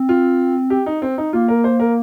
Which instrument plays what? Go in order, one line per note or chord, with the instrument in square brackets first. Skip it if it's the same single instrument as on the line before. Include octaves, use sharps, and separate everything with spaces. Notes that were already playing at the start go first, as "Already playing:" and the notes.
Already playing: [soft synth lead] C4
[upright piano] F4
G4
D#4
C4
D#4
[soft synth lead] A#3 [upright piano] F4
[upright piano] A#4
C5
A#4